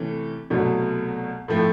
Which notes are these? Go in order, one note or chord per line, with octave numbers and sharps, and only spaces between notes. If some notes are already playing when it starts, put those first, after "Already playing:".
Already playing: C3 E3 A3 C#4
C2 B2 F#3 A3
A2 F3 A3 C4